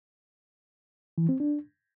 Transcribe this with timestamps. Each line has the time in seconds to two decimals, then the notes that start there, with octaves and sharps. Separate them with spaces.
1.18 E3
1.29 C4
1.40 D4